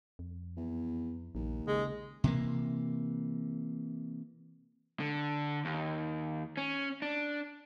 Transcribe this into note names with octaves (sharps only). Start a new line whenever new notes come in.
F2
E2
A#1 D#2
C#3 G#3
C3 E3 A#3
D3
D#2
C#4
D4